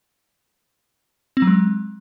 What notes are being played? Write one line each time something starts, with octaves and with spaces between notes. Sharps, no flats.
C4
F#3
G#3